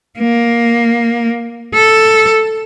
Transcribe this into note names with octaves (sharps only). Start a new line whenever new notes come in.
A#3
A4